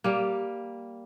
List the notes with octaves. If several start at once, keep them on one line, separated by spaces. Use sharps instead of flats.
G3 A#3